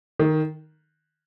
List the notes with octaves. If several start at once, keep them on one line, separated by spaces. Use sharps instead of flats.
D#3